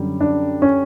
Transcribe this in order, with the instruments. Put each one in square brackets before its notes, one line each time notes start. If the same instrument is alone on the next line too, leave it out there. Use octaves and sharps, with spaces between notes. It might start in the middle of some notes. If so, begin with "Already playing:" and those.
Already playing: [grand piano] F#2 D3 G3
D4
C#4